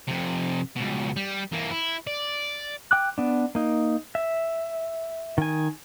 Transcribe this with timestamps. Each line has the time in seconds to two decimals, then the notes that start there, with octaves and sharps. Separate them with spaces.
0.08 F2 C3
0.76 C#2 B2
1.16 G3
1.53 E3 A#3
1.71 E4
2.07 D5
2.91 G5 D6 F#6
3.18 B3 D4
3.55 A#3 D#4
4.15 E5
5.38 D#3 G#5